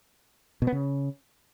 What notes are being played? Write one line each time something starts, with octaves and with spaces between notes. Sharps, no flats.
B2
B3
C#3